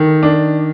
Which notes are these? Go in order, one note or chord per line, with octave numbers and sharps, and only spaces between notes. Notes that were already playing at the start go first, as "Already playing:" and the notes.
Already playing: D#3 A4
D4